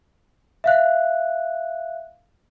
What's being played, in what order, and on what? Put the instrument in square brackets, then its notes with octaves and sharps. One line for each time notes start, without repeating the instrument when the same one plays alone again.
[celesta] E5 F5 F#6